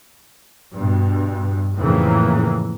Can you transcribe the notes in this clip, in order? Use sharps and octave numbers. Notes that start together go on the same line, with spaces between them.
G2 B2
F2 A2 C#3 E3 A#3